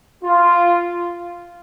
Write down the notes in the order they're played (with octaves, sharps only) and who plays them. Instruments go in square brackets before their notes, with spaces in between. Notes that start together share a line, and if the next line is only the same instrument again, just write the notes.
[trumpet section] F4